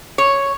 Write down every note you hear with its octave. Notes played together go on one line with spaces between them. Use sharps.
C#5